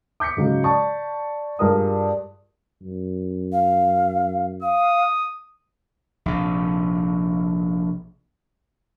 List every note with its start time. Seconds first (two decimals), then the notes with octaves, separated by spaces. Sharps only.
0.20 D6 G6 B6 C#7
0.37 G#2 C#3 F#3
0.64 D5 A5 C#6
1.59 G2 F4 G#4 A#4 D5 D#6
2.82 F#2
3.52 F5
4.62 F5 D#6
6.26 A#1 C3